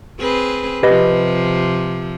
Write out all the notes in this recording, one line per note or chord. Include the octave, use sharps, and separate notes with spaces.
C4 G#4 B4
C3 F3 G4 B4 D#5